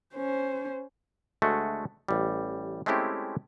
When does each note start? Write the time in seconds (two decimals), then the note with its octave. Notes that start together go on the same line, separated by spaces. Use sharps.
0.15 C#4 C5
1.42 D2 G#3 A3 F#4
2.09 A1 G3
2.86 G#3 A3 C4 C#4 E4 G4